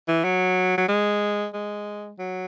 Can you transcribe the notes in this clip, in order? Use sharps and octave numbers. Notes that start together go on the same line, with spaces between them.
E3
F#3
F#3
G#3
G#3
F#3